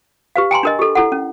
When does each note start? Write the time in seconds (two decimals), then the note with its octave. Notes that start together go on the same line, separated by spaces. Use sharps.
0.36 G4 B4 F5
0.51 G5 G#5 A#5 C6
0.63 D4 A#4 D#5
0.79 G4 A4
0.95 E4 A4 F#5
1.12 C#4